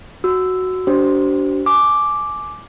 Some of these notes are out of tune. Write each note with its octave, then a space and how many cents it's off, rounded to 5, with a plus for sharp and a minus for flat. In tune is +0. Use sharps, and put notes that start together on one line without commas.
F#4 +0 E6 +0
D4 -30 F#4 +45 C5 -10
G#5 +30 D6 +0